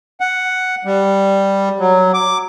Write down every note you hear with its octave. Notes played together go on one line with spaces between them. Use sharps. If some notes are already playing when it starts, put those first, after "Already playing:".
F#5
G3
F#3
D6